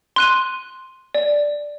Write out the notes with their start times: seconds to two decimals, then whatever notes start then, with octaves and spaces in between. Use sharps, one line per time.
0.16 C6 F#6 D#7
1.14 D5